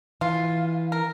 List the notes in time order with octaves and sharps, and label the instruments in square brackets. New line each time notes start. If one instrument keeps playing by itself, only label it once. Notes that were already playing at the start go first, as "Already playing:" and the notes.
[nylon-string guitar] E3 [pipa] F4
[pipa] A#4